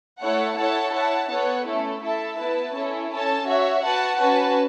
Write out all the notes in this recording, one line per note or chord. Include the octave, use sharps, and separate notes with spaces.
A3 E4 A4 C#5 F#5
E4 A4 C#5 F#5 A5
E4 C#5 F#5 A5
B3 A4 C#5 F#5
A3 C#4 E4 A4
E4 A4 E5 A5
B3 E4 B4 A5
C#4 E4 A4
C#4 A4 C#5 A5
F#4 C#5 E5
F#4 B4 F#5 A5
C#4 F#4 B4 A5